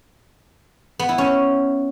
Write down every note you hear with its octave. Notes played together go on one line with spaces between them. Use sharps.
B3
E4
C#4